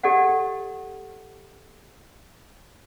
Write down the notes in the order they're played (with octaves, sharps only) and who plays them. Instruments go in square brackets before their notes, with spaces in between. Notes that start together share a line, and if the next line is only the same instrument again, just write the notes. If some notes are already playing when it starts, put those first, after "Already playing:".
[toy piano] G4 A4 D5 D#5 F#5